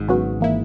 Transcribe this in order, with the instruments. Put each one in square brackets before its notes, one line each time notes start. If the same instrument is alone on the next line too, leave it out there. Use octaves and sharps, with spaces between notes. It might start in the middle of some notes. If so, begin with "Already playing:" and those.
Already playing: [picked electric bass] G#1 G#2
[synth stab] C#3 F#3 B3 F#4
E3 A#3 E4